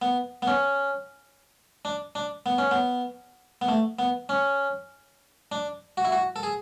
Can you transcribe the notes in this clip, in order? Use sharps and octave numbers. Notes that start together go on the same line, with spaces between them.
B3
B3
C#4
D4
D4
B3
C#4
B3
B3
A3
B3
C#4
D4
F#4
E4
F#4
A4
G#4